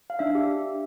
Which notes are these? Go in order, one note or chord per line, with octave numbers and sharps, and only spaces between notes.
F5
D4 E5
G4